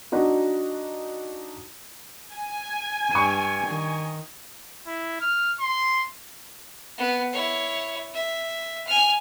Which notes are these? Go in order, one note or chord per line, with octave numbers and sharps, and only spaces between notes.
F#3 D4 D#4 F#4
G#5
G2 C#6 D#7
D#3
E4
F6
C6
B3
E4 C#5
E5
G#5 F6